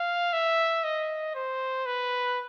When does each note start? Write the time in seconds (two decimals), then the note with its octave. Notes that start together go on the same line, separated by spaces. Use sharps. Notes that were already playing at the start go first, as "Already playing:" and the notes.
Already playing: F5
0.33 E5
0.84 D#5
1.35 C5
1.86 B4